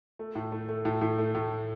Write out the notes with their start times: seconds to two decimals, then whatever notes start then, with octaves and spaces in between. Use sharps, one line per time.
0.19 A3
0.35 A2
0.52 A3
0.69 A3
0.85 A2
1.01 A2
1.19 A3
1.35 A2